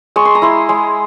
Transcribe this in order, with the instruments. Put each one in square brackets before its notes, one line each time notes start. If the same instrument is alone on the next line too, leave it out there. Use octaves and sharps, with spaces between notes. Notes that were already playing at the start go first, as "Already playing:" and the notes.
[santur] G#3 C#6
C6
A#5
E4 C6
G#3